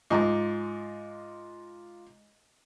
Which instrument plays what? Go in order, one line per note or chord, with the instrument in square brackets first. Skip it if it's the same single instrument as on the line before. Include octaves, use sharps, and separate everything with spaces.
[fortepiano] G#2 [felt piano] F4 A#5 D6